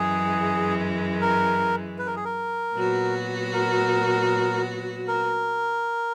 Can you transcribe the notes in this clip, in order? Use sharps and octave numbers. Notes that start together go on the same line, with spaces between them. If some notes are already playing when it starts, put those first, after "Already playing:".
Already playing: F#2 E3 G#3 G#4
A#4
B4
A#4
G#4
A#4
A#2 F#3 B3 F#4
A#4
A#4